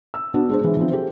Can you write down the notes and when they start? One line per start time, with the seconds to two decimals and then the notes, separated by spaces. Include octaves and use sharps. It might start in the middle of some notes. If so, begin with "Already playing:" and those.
0.14 E6
0.34 B3 D4 F#4
0.49 G#3 D4 C5
0.61 E3 G#3
0.77 E3 F3 C4
0.90 G4 A4 C5